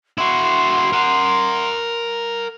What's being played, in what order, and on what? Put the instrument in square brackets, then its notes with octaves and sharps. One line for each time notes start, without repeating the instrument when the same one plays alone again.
[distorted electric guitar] E4 F#4 [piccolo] C6
[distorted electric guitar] A#4 F#5